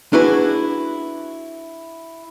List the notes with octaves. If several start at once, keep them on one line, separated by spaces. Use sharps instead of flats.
D4 E4 F#4 G#4 B4